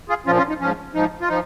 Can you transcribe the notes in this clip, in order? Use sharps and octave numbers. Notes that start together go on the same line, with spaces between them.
F4 G#4
A#2 F3 C#4 F4
C#4 F4
D#4
G#2 F3 C#4
G#2 F3 D#4
F4
F3 D#4